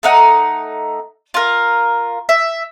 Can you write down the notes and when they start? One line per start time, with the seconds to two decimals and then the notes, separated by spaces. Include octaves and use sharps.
0.03 A3 D#4 F#5
1.34 F4 A#4
2.29 E5